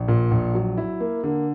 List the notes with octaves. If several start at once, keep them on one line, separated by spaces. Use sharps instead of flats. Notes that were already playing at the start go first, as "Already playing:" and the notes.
Already playing: A#1
A#2
A#1
F#3
E4
A#3
D3